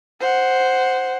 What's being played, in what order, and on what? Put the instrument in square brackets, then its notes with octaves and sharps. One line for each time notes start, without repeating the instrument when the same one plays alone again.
[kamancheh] C5 F#5